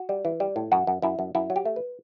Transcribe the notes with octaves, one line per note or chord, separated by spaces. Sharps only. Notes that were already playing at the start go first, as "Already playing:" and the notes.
Already playing: F#4
G3
E3
G3
A2
F#2 F#4
F#2
F#2 E4
F#2
F#2 E4
F#3
G4
A3
B4